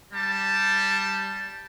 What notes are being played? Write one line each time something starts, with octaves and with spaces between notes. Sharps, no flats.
G3 A5